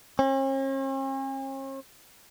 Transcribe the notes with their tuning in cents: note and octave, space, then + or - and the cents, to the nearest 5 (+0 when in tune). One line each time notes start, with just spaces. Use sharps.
C#4 -45